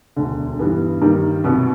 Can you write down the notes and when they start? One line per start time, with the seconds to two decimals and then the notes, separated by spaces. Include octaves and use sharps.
0.16 E1 D2 D3
0.59 G2 E3 G3 B3
1.01 G2 D#3 G3 A#3
1.44 C2 B2 F#3 B3